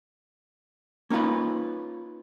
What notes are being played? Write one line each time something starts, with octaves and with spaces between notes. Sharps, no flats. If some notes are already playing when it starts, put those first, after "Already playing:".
A#3 C#4 D#4 F4 B4